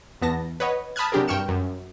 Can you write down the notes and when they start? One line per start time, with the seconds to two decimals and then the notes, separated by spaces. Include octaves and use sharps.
0.22 E2 B3 A5 A#6
0.60 B4 C#5 D#5 F#5
0.96 A5 B5 D#6 F6 F#6 G#6
1.12 C3 F#3 D4 G4 G#4 A#4
1.28 G2 G5 C#6 F6 C#7 E7
1.48 F#2